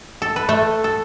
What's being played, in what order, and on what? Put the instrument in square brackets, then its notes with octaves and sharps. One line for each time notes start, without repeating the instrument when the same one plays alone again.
[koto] A4
B4
A3 A4
A4